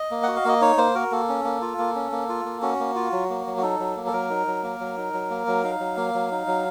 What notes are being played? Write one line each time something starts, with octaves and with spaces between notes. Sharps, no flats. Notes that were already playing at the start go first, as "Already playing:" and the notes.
Already playing: D#5
A#3
F#4 F#5
F5
A#3 D#5
D#4 C#5
A#3 C5
F#4 A#4
A#3 A4
C#4
A#3
F4
A#3
C#4
A#3
F4
A#3
C#4 F#4
A#3
F4
F#3
A#3
F#3
F#4
D#4 A4
F#3
A#3
A4
F#3 A#4
D#4
F#3
A#3
F#3
D#4
F#3
A#3
F#3
D#4 F5
F#3
A#3
F#3
D#4
F#3